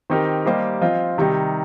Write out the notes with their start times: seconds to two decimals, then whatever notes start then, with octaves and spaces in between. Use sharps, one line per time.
0.10 D#3 C4 D#4 G4 A#4
0.45 G3 A#3 G4 C5 D#5
0.81 F3 C4 F4 D#5
1.18 C3 D#3 G3 D#4